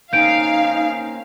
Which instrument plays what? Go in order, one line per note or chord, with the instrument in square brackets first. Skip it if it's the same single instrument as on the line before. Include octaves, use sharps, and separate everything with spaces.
[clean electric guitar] A#3 C4 C#4 [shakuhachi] D#4 [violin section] F5 [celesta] G6 D7